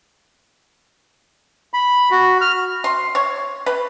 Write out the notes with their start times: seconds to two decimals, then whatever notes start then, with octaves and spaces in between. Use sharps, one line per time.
1.74 B5
2.11 F#4
2.41 F6
2.84 C6
3.15 C#5
3.66 B4